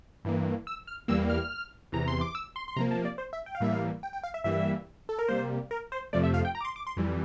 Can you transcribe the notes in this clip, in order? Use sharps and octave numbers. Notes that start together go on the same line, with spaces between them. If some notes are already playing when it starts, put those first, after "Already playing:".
G2 E3 A#3
E6
F6
E2 E3 G3 A#3 E6
F6
E2 C3 E3 A#5
C6
D6
E6
C6
C6
C3 F3 A#3 A#5
A5
D5
C5
E5
G5
F5
A2 E3 G3 A#3 E5
F5
G5
G5
F5
E5
G2 E3 G3 A#3 E5
A4
A#4
C3 G3 A#3 C5
A#4
C5
F2 C3 F3 A3 D5
E5
F5
G5
A#5
D6
C6
D6
C6
F2 E3 G3